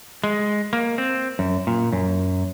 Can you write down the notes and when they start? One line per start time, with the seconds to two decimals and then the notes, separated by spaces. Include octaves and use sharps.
0.24 G#3
0.73 A#3
0.98 C4
1.39 F#2
1.67 A#2
1.93 F#2